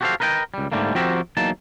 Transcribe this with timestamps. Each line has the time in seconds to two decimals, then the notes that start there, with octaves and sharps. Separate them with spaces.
0.01 F#4 G4 A4 B4 C5 F5
0.20 A#4 B4 D#5 F5 G5
0.54 C#2 G3
0.72 G#2 B2 D3 G3 A3 A#3
0.95 F3 C4 F#4 G4 A#4 E5
1.37 E2 F#3 A#3 D#4 A5